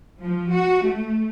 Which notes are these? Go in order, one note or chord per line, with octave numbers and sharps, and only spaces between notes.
F3
F#4
A3